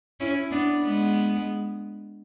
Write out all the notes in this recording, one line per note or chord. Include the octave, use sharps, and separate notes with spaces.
C#4 E4
B3 D4
G#3 B3